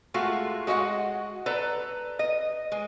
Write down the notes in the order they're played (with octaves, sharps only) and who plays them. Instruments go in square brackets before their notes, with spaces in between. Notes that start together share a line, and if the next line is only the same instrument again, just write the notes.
[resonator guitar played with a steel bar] G#3 A3 F4 F#4
G#3 F#4 D#5 E5 F#5
A4 B4 D5 A#5
D#5
G#3